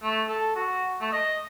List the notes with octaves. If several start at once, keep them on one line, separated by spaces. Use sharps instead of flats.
A3
A4
F#4
A3
D#5